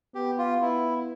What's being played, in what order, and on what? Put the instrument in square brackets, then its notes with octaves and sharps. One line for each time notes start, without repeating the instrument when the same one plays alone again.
[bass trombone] B3 [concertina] G4
[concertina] F4
[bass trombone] B3 [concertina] E4